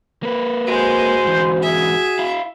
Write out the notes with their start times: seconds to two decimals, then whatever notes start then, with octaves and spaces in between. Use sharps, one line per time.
0.23 A#3 B4
0.67 G#3 F#4 C5
1.25 G#2 E3
1.62 G#4 E5
2.19 E4 F5